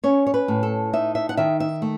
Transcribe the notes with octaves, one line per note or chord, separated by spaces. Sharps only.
C#4 C#5
C#5
B4
A2
A4
D#4 E5
E5
F#5
D#3 E5
E5
A3